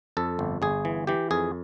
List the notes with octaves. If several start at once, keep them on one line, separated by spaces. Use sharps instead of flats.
F2 A4
G1
G1 G#4
E3
E3 G4
F2 G#4